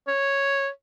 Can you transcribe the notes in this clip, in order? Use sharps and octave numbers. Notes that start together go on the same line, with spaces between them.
C#5